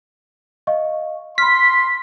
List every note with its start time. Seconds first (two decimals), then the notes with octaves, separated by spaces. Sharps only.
0.67 D#5 F5 C#6
1.38 B5 C6 F6 B6